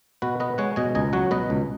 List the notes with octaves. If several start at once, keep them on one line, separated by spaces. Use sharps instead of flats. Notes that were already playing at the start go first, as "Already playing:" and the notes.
B2 F#4 B4
B3 B4 D#5
G#3 C#5 F#5
B2 D#5 G#5
C#2 D#5 G#5
F#3 C#5 F#5
B2 B4 D#5
C#2